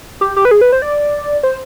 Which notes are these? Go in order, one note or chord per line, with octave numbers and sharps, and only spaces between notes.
G4
G4
B4
G#4
B4
C5
D5
C5